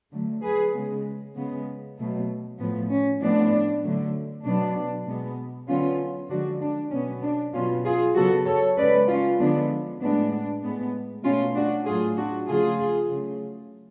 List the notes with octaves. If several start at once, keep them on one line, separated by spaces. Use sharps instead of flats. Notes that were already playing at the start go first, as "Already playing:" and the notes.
D3 F#3 A3
G#4 B4
C#3 G#3 B3
C#3 G#3 B3
B2 F#3 A3
A2 F3 B3
C#4
A2 F3 B3 D4
D3 F#3 A3
B2 F#3 B3 D4
B2 G#3 B3
D3 F#3 B3 C#4 F4
D3 F3 G#3 D4 F#4
D4
B2 F#3 B3 C#4
D4
B2 F#3 B3 C#4 F4
F4 G#4
C#3 F#3 B3 F#4 A4
A4 C#5
C#3 G#3 B3 B4 D5
C#4 F4
D3 F3 G#3 B3 D4
A2 G#3 B3 D4
A2 G#3 B3
B2 A3 C#4 F4
D4 F#4
A2 F#3 A3 F4 G#4
D4 F#4
C#3 F3 A3 F4 G#4
C#3 F#3 A3